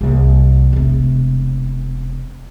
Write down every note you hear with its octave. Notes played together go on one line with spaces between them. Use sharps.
C2 A#3
E1 C3